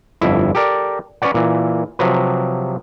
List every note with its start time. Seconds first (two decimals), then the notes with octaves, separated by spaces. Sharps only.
0.21 G1 F2 E4
0.55 G4 A4 A#4 D5
1.22 C#4 B4 C#5 D5 F#5
1.34 A#2 E3
1.99 C3 F3 F#3 B4